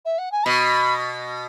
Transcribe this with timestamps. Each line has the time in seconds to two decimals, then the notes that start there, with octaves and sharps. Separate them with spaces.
0.05 E5
0.18 F#5
0.32 G#5
0.46 B2 B5